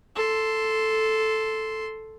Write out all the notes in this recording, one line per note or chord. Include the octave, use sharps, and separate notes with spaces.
A4 C6